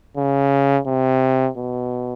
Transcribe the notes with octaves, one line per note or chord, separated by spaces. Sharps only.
C#3
C3
B2